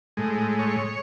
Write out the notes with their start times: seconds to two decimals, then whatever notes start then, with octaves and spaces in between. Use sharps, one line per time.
0.17 A2 G#3
0.59 C#5